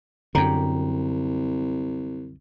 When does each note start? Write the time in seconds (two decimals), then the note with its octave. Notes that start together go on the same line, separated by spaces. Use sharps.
0.35 C2 F#2 D3 G4 A#5